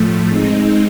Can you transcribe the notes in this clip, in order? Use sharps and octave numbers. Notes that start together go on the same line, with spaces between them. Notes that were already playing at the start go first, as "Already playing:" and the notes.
Already playing: A2 F3 A3
G#3 C4 D#4